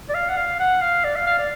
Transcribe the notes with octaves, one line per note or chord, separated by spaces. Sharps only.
D5
F5
F#5
F5
F#5
F5
D5
F5
F5
D5